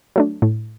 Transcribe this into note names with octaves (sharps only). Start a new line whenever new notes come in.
F#3 A3 D4
A2